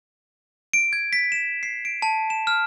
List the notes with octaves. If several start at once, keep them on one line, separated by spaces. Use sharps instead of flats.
D7
G#6
B6
E7
C7
D7
A5
E7
F6